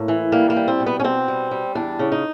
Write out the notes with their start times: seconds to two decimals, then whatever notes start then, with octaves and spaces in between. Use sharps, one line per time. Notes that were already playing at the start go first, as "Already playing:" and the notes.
Already playing: A2 A#3
0.08 E3
0.32 G3 A#3
0.50 A#3
0.56 G3
0.68 C4
0.80 B2
0.86 B3
1.00 C#4
1.04 B2 C4
1.28 G3
1.51 G3
1.75 E2 D4
1.99 C#3
2.12 D#4